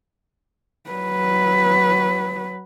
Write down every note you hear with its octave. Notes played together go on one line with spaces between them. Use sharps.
F#3 B4